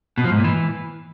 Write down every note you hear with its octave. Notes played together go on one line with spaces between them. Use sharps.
B2
F3
G#2
A#2
E3